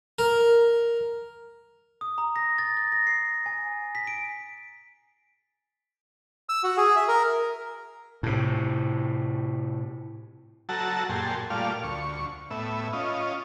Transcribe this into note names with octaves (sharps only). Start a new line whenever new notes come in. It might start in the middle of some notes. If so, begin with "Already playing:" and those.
A#4
D#6
A#5
A#6
A6
A6
A#6
C7
G#5
B6
D7
E6
F#4
G#4
E5
A#4
A2 C3
F#3 F#4 A4 A5 A#5 E6
F#2 A#2 G4 G#4 A5 C6
A#2 G3 A3 F4 D5 F5
D2 C#6
A2 B3 E5
C#4 F4 D#5